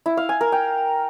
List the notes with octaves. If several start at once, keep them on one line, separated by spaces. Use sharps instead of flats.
E4
F5
G#5
A#4
G5